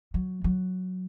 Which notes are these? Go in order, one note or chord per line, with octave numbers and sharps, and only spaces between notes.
F#3
F#3